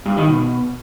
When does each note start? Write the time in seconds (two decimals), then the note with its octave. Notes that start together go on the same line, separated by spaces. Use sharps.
0.06 G2
0.17 D#3
0.28 B2